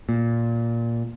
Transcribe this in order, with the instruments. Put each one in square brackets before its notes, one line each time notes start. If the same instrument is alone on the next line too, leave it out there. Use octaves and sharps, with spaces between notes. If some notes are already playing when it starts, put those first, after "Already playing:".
[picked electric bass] A#2